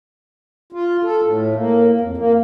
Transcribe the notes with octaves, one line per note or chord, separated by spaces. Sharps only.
F4
A4
A2
A#3
F2
A#3